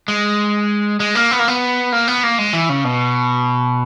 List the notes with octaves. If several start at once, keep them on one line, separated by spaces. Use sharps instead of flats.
G#3
G#3
A#3
B3
A#3
B3
A#3
B3
A#3
G#3
E3
C#3
B2